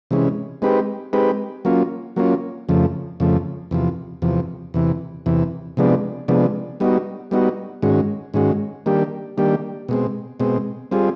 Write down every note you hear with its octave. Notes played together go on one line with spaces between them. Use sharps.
C3 E3 G#3 C#4
G#3 C4 D#4 G4 B4
G#3 C4 D#4 G4 B4
F#3 A#3 C#4 F4
F#3 A#3 C#4 F4
F2 C#3 F3 A3
F2 C#3 F3 A3
E2 C3 F3
E2 C3 F3
E2 C3 E3
E2 C3 E3
C3 F3 G#3 B3 D4
C3 F3 G#3 B3 D4
G3 B3 D#4 F#4
G3 B3 D#4 F#4
G#2 D#3 G#3 C#4 F#4
G#2 D#3 G#3 C#4 F#4
D#3 G3 A#3 D4 G4
D#3 G3 A#3 D4 G4
B2 G#3 C4
B2 G#3 C4
G3 C4 F4 G#4